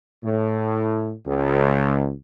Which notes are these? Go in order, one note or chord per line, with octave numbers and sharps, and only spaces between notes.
A2
C#2